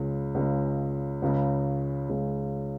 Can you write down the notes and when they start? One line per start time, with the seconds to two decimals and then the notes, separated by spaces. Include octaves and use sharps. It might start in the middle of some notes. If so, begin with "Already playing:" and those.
Already playing: C#2 C#3 G#3
0.35 C#2 C#3 G#3
1.22 C#2 C#3 G#3
2.09 C#2 C#3 G#3